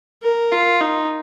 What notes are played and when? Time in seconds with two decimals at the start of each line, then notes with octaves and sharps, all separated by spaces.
0.23 A#4
0.52 F4
0.81 D#4